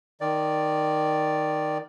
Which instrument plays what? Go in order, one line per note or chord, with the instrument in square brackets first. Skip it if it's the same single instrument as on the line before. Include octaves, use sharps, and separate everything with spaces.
[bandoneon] D#3 D5